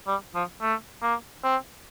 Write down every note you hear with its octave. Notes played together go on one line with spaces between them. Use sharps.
G3
F3
A3
A#3
C4